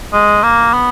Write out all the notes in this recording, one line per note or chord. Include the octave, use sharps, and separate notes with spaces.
G#3
A#3
B3